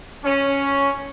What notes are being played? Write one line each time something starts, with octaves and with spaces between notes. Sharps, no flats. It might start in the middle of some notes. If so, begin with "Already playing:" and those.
C#4